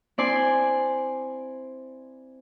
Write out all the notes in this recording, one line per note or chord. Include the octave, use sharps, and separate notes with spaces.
C4 E4 D5 G#5 C6